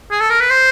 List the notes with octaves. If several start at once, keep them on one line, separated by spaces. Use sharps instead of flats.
G#4
A4
A#4
B4
C5